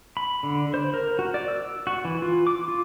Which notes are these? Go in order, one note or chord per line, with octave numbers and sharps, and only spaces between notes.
B5
D3
C5
A#4
F#4
D5
E6
F#4
E3
F4
D6
F4